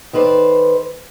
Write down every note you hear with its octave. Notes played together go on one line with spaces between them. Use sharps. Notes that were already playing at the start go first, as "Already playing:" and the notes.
D#3 A4 B4 C5 D5